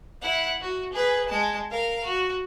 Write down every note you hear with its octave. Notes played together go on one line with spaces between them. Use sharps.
E4 F#5
F#4
G#4 B4
G#3 A5
A#4 F5
F#4